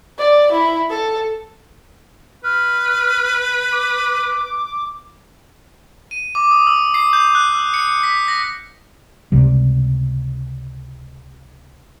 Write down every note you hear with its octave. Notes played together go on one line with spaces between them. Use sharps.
D5
E4
A4
B4 F6
D6
D#7
D6
D#6
E6
C7
G6
F#6
E6
C#7
B6
A#6
C#2 C3 G3